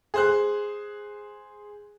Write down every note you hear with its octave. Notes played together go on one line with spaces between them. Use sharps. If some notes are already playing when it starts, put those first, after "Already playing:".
G#4 C5 F#6